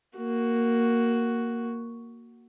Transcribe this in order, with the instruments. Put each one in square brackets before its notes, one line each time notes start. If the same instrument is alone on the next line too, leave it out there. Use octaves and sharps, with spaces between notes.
[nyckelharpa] A#3 F#4